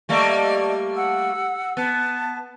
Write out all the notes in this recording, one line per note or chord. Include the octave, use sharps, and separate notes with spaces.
G3 A3 A#3 D5 D#5
F#5 E6
B3 A5